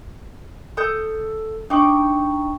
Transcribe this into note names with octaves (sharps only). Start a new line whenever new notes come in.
A4 D#6 G6
D4 D#4 G5 C#6 D6